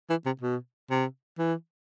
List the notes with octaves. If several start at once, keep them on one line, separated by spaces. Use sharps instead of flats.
E3
C3
B2
C3
E3